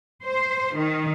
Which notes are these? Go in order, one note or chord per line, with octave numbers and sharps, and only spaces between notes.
C5
D#3